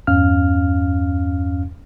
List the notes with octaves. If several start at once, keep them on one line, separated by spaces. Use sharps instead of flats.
E2 G2 C#4 F5 F6